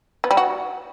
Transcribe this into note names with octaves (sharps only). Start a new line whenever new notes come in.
B3
G3
F#4